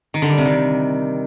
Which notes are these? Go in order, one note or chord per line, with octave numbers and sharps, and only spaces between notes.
D#3
D3
G3
C3
D#3